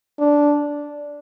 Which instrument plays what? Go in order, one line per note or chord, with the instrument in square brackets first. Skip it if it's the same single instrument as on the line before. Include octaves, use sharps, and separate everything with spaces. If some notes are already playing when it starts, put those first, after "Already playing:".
[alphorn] D4